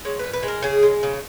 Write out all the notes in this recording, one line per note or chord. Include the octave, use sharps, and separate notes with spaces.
G#3 C#5
A#2 B4
B4
G#3
A#4
C#3 G#4
G#3
C#3